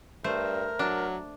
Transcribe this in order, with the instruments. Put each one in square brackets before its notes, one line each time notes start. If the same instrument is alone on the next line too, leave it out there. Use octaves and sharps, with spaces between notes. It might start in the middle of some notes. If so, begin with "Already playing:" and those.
[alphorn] G2 [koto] A3 C5 [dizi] A#4
[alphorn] F#3 [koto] D4